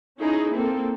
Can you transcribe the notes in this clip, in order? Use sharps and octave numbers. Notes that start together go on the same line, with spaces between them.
C#4 D#4 E4 G#4
A#3 C4 A4